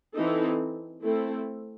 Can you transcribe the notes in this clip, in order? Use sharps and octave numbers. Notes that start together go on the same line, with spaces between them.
E3 C4 D#4 A4
A3 C4 E4 A4